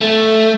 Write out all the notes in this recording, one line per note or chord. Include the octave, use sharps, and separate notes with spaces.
A3